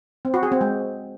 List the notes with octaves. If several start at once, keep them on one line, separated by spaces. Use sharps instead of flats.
C4
F#4
G#4
C4
G#3